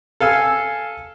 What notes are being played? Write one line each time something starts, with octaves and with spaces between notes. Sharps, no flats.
A4 F5 G#5 E6